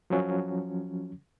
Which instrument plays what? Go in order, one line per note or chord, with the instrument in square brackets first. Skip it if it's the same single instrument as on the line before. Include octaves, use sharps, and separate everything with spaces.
[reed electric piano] F3 F#3 C#4